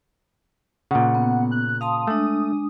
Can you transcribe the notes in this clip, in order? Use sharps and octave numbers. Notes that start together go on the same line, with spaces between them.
A#2 C#3 F#5
B3
F#6
F5 A5 C6 D#6
G#3 A3 D4